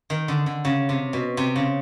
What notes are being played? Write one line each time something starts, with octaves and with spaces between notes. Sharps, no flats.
D#3
D3
D3
C#3
C3
B2
C3
C#3